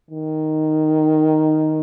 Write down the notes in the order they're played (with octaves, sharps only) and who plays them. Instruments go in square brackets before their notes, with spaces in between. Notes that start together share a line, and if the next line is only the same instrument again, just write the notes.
[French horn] D#3